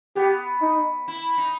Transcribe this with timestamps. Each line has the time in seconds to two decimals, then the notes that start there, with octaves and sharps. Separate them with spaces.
0.16 B3 G4
0.62 D#4
1.08 E4
1.38 D#4